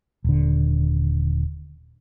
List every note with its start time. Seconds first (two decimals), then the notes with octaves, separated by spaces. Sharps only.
0.24 D#1 D3